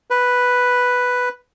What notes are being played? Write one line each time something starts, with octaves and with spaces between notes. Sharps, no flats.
B4